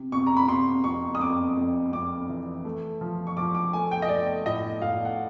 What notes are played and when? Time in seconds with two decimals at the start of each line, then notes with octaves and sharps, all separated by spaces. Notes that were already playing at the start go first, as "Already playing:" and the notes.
Already playing: C3
0.12 C3 C#6
0.27 A#5
0.37 B5
0.48 C3 C6
0.84 F2 C#6
1.15 D#6
1.20 F2 D6
1.57 F2
1.92 F2 D6
2.29 E3
2.65 A3
3.01 F3
3.27 C#6
3.37 F3 D6
3.55 D6
3.73 A3 G#5
3.91 G5
4.02 D#5
4.09 A3 D5
4.46 A2 D#5
4.82 A2 F5
5.05 F#5